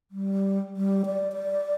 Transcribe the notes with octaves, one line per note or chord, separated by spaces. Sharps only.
G3
G3
D5
D5